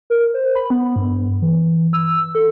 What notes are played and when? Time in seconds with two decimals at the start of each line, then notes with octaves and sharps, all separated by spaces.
0.10 A#4
0.34 C5
0.55 B5
0.70 B3
0.96 G2
1.42 E3
1.93 E6
2.35 A4